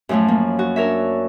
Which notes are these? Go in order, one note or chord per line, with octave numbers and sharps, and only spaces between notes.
F#2 A2 F3 F#3 A3
A#3
F#4
D4 A#4 C#5 E5